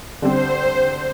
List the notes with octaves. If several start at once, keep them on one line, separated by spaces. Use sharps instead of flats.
D3 G3 C4 C5